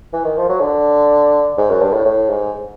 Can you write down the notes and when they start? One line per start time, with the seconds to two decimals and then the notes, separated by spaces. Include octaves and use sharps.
0.13 E3
0.24 D#3
0.37 F3
0.49 F#3
0.61 D3
1.58 G#2
1.69 F#2
1.81 G2
1.93 A2
2.05 A2
2.29 G#2